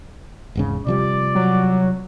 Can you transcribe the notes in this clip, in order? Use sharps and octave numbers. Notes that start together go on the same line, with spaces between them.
E1 G#2 C#3
C3 F3 G3 D5
F#3